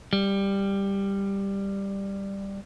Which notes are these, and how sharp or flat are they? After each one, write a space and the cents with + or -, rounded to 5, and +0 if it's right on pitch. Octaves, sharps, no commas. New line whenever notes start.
G3 +10